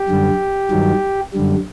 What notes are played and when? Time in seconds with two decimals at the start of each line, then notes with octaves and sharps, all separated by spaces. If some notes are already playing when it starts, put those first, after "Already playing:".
Already playing: G4
0.08 F#2 D3 G3
0.71 G2 D#3 F#3
1.34 F#2 D3 G3